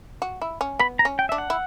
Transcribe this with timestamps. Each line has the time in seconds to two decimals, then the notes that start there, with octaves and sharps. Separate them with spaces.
0.22 F#4
0.42 E4
0.61 C#4
0.79 B3 B5
0.99 A#5
1.05 C#4
1.19 G5
1.29 D4 E5
1.38 F#5
1.50 E4